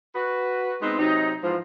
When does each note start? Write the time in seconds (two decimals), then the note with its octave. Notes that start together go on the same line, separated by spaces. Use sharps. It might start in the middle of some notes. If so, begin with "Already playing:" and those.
0.15 F#4 B4
0.82 G#3 B3 C4 D#4
0.99 C3 F#3 D#4
1.43 G#2 E3 F3